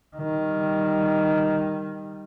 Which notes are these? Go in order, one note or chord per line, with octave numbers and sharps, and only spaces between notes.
D#3 G3